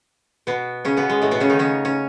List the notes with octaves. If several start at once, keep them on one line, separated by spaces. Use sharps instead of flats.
B2 B3
C#3 C#4
B2 B3
G#3
A2 A3
B2 B3
C#3 C#4
D#3 D#4
C#3 C#4
C#4